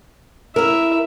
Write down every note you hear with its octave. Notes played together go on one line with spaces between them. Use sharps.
E4 A#4 E5